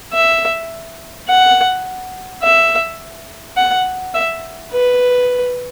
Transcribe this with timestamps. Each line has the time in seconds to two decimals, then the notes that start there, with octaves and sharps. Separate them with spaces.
0.13 E5
1.29 F#5
2.43 E5
3.57 F#5
4.14 E5
4.72 B4